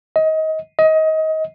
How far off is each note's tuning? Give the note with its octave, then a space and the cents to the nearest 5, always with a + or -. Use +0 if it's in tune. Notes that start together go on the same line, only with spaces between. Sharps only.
D#5 +25
D#5 +25